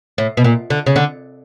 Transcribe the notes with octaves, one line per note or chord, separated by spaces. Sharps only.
A2
B2
A#2
D3
C#3
D3